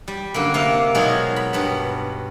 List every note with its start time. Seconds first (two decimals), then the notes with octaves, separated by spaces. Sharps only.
0.08 G3
0.34 F#2 D3 A#3
0.54 C3 A#3 F5
0.94 B2 F#3 G#3 D#4 G#4 A#4
1.36 B5
1.53 G2 B2